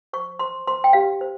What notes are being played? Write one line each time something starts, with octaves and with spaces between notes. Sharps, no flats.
C5 C#6
C5 C6
C5 C6
G5
G4 F5
C5